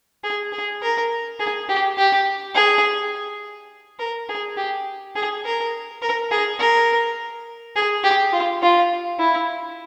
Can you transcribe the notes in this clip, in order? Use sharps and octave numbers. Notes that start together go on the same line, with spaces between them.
G#4
G#4
A#4
G#4
G4
G4
G#4
A#4
G#4
G4
G#4
A#4
A#4
G#4
A#4
G#4
G4
F4
F4
E4